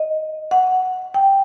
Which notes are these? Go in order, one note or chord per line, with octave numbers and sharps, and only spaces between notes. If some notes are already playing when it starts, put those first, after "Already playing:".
Already playing: D#5
F#5
G5